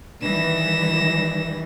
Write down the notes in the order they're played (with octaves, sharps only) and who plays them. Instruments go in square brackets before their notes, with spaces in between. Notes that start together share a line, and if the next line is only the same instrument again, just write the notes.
[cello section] D#3 E3 G3 [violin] A#6 E7